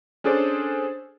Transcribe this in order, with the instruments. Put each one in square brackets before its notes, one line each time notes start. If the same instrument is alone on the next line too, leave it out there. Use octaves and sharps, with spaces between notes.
[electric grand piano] C#4 D4 G#4 A4 C5 D5